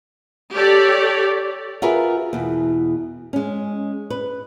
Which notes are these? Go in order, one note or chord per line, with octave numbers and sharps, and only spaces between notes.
G4 A4 C#5 D5
F4 F#4 G#4 A#4 B4 E5
E2 B2
G#3 C#4
B4